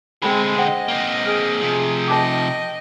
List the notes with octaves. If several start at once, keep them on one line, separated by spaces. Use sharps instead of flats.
D3 G#3 C4 G#4 G5 B5
C5 D#5 F#5 G5
A#3 C4
G#4 F6 D7
C3 F3
D#5 G5 A5 D6